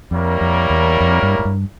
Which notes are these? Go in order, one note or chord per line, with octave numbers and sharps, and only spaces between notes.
F2 G3 A#3 E4 A#4 C#5
F2
E2
F2
G2
G#2
G2